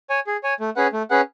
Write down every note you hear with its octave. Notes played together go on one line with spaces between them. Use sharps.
C#5 G#5
G#4
C#5 G#5
A3
C#4 G#4 B4 F#5
A3
C#4 G#4 B4 F#5